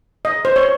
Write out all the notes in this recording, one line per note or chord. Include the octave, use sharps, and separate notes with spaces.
D#5
C5
C#5